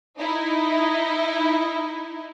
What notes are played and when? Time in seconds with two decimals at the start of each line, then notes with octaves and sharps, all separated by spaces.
0.18 D#4 E4